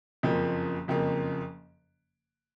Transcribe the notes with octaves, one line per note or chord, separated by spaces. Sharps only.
F#1 F2 C#3 F3 A#3
F#1 F2 C#3 F3 A#3